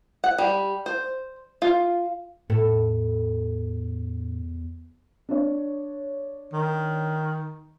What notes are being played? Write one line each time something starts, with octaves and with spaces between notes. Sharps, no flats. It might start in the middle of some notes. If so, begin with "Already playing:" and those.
F#5
G3
C5
F4
E2 A2 A4
D4 C#5
D#3